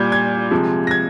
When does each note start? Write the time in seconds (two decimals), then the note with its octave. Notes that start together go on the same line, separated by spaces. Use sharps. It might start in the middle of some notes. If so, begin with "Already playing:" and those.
Already playing: A#2 G3 G6 G#6
0.12 G#6
0.51 C3 F3 G#3
0.87 A#6
0.91 G#6